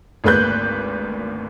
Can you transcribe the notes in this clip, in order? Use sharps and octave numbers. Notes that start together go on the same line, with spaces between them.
G#1 D2 A#3 B4 F#6 G6